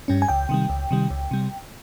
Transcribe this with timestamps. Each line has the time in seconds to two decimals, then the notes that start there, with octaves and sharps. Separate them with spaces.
0.08 G2 G3 C#4
0.22 G#5
0.29 C#2 G5
0.49 C3 D#3 G3
0.69 C#2
0.91 C3 D#3 G3
1.10 C#2
1.31 C3 G3